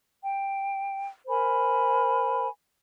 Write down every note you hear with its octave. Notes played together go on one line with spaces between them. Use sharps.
G5
A#4 C5 G#5 B5